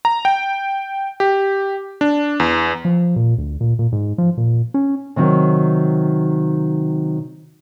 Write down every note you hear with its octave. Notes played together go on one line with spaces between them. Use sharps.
A#5
G5
G4
D4
E2
F3
A#2
D2
A#2
A#2
G#2
F3
A#2
C#4
C3 D#3 F#3